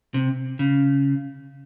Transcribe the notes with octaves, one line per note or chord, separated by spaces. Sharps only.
C3
C#3